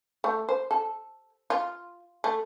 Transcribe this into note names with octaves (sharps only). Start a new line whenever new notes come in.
A3
C5
A4
F4
A3